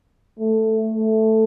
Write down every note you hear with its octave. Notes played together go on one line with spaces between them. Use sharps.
A3
A3